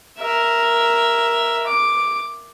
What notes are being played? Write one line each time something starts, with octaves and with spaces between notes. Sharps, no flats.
A#4 E5
D6